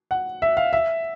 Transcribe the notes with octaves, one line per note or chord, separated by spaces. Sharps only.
F#5
E5
F5
E5